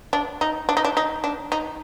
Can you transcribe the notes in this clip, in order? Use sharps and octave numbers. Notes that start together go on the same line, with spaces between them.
D4
D#4
D4
D#4
D4
D#4
D4
D#4